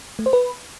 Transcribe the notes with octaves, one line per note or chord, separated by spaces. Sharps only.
A3
C5
B4